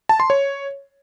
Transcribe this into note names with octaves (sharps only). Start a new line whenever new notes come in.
A5
C6
C#5